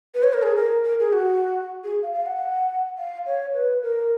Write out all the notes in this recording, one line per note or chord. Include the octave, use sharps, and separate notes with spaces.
B4
C#5
A#4
G#4
A#4
A#4
G#4
F#4
G#4
F5
F5
F#5
F5
C#5
B4
A#4